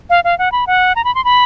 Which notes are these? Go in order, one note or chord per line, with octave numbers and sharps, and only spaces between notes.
F5
F5
F#5
B5
F#5
A#5
B5
C6
B5